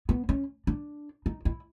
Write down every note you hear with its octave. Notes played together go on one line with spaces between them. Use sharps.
B3
C#4
D4
D#4
E4